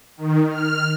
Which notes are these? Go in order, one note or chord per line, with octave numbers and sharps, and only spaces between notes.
D#3
F6